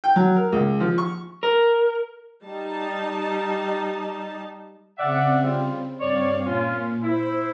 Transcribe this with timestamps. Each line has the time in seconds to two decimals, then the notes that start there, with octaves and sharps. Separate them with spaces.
0.04 G5
0.16 F#3
0.36 A#4
0.52 C#2
0.80 F3
0.98 C#6
1.43 A#4
2.44 G3 D#4 A5
4.98 C#3 C4 D5 E5 F#5
5.43 G3 F4
6.01 G2 C4 C#5 D5 F5
6.46 A#2 C#4 F4
7.03 E4 C5